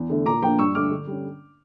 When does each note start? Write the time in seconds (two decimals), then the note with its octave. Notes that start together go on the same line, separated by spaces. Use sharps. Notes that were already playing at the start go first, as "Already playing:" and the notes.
Already playing: E2
0.10 D3 A3
0.26 A#2 A#5 D6
0.42 F3 A#3 D4 G5 A#5
0.58 G2 C#6 E6
0.75 D3 A3 D4 D6 F6
0.91 D3
1.07 G3 C#4